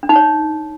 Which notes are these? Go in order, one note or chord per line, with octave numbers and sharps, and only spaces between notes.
D4
D#4
C#5